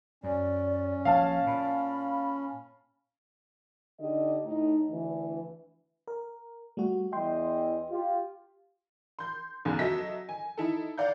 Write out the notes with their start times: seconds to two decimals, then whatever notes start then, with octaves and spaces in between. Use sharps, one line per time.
0.24 F#2 C#4 D5
1.05 A#1 C#5 F5 A5
1.47 A#2 B5
3.99 D3 D#4 G4 D#5
4.44 A2 D#4
4.90 D2 E3
6.08 A#4
6.77 G3 A3 F#4
7.13 E2 E3 D#5 G5 C6
7.89 F4 G4
9.19 C6 G6
9.65 B1 E2 G#2 C#3 G#5 B5
9.79 F#3 A4 D#5 E5 A#6 B6
10.29 G#5
10.57 D#4 E4 A4
10.98 D5 F5 F#5 G6